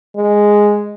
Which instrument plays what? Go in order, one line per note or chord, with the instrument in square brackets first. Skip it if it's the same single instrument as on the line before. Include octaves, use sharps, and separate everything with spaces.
[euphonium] G#3